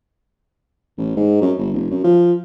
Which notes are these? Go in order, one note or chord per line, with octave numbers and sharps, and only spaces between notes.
A1
G#2
F#2
G1
F1
F#2
F3